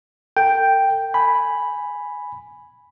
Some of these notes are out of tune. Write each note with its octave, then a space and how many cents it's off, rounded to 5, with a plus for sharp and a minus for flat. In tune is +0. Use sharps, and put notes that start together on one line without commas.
A4 +45 G5 +0
G#5 +0 B5 +0